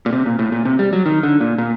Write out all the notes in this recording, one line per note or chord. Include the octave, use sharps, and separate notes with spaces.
A#2
C3
A#2
A2
A#2
C3
G3
F#3
D#3
D3
A#2
A#2